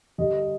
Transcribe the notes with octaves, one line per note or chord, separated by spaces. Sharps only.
G2 D3 G3 D#5
D#5